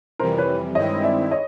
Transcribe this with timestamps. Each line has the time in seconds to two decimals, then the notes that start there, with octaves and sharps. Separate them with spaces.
0.19 F2 C3 E3 G3 A#4 C5
0.38 B4 C#5
0.75 G2 D#3 G#3 C4 E4 C#5 D#5
1.03 D5 E5
1.31 C#5 D#5